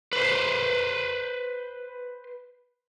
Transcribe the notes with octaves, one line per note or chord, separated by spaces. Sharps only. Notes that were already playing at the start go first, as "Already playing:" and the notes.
B4 C5